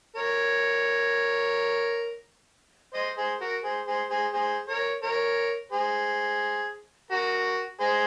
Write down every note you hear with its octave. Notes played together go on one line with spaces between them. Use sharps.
A#4 C#5
C5 D#5
G#4 C5
F#4 A#4
G#4 C5
G#4 C5
G#4 C5
G#4 C5
A#4 C#5
A#4 C#5
G#4 C5
F#4 A#4
G#4 C5